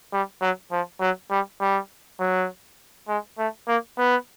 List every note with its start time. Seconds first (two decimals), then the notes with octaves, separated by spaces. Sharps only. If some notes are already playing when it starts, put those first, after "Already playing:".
0.13 G3
0.42 F#3
0.72 F3
1.01 F#3
1.31 G3
1.61 G3
2.20 F#3
3.08 G#3
3.38 A3
3.68 A#3
3.98 B3